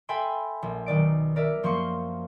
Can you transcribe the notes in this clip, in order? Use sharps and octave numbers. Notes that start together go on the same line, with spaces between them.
A4 E5 G5 G#5 B5 C6
A#1
B1 D#3 D5 D7
A#4 D5 E5 F6
F#2 F3 A#3 C5 C6 C#6